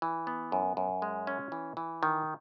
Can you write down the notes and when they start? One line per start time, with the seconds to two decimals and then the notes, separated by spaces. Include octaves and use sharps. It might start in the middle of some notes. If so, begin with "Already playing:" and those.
0.02 E3
0.27 B3
0.52 F#2
0.77 F#2
1.02 G#3
1.27 C#4
1.52 E3
1.77 E3
2.03 D#3